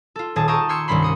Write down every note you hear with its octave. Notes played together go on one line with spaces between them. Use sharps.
F4 A4
D#1 G#4 A5
G5 A5 A#5 C#6 D#6 E6
C6 E6 F6 G#6 C#7
C2 G2 D#3 C#4 B5 C6
A#3 D#6 C#7